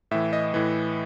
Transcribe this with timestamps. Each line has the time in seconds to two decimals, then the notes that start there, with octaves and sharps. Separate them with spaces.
0.11 A2 E3 E5
0.33 D#5
0.54 A2 E3